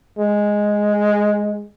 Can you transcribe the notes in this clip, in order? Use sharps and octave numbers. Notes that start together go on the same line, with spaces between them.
G#3